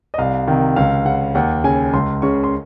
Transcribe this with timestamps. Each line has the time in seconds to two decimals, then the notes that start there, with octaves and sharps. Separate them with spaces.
0.14 D#5
0.18 C2 F5
0.48 C3 D#3
0.76 C#2 F5
1.06 C#3 F#5
1.35 D#2 F#5
1.64 C#3 G#5
1.93 C#2 C6
2.22 C#3 C#6
2.44 C6